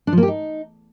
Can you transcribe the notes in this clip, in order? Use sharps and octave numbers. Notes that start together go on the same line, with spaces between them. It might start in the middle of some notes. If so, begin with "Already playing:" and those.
D4
F3
A#3
G4
D#4